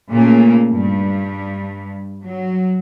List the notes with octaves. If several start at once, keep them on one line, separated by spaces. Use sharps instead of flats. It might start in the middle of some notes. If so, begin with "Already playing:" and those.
A#2 C#3 A3 A#3
G2
F#3